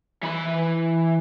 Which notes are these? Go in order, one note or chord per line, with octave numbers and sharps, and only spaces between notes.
E3 B5